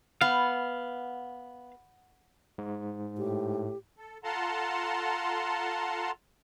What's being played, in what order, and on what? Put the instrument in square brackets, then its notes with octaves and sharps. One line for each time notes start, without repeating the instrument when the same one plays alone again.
[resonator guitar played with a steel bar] B3 [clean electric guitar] F5
[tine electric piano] G#2
[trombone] A2 [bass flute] G4
[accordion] A4
F4 A4 F#5 A5 A#5 C6